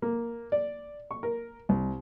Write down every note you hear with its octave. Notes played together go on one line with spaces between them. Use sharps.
A#3
D5
C#6
A#4
C2